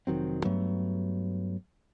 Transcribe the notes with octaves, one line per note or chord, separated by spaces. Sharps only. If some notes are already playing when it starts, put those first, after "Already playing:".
F1 D#3 F#3 C4
G2 F#3 A3 B3